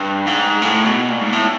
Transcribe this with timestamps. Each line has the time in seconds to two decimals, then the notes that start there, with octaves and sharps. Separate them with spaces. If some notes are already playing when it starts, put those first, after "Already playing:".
Already playing: G2
0.27 G#2
0.62 A2
0.86 B2
1.09 A#2
1.21 G#2
1.33 A2